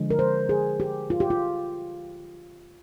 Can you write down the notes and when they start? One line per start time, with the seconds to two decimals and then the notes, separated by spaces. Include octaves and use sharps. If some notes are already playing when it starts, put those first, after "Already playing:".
Already playing: D3 F3 G#3
0.10 A#4
0.19 C5
0.49 G#4
0.80 G4
1.10 F4
1.20 G4
1.30 F4